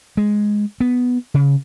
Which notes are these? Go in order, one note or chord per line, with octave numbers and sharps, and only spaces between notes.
G#3
B3
C#3